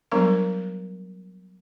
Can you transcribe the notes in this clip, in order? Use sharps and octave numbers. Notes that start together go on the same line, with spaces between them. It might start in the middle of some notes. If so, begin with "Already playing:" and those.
F#3 G3 B3 D4 A#4 A#5